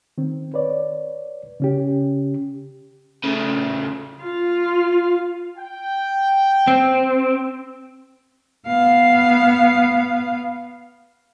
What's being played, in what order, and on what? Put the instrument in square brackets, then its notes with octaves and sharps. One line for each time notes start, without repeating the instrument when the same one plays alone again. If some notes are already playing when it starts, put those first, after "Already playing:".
[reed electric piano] D#3 C4
B4 C#5 D5
C#3 C#4 G4
[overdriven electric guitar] C#3 A3
[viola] F4 F5
[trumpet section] G5
[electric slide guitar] C4
[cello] B3 F5